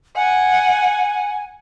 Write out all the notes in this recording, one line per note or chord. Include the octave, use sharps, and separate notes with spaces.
F#5 G#5